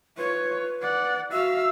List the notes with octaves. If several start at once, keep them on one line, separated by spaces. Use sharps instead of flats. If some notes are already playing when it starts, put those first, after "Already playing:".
F4 B4 C#5
D5 F#5
F#4 E5 F5 E6